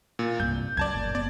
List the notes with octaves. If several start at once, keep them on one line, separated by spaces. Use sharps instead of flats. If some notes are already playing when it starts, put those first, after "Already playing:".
A#2
C2 G2 G6
C#2 F#2 D5 A5 G#6
F#1 A#2
G1 B3 D5